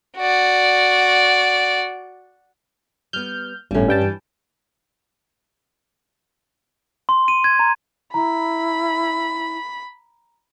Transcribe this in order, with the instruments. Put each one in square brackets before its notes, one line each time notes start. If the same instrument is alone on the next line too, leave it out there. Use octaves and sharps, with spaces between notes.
[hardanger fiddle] F#4 D5
[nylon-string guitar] G3 B3 [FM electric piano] F6 G6
[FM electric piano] G1 A2 [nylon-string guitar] G3 C#4
[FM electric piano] G2 G5 A5
[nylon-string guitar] E3
[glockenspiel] C6
D#7
G#6
A#5
[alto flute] E4 [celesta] A#5 [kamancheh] B5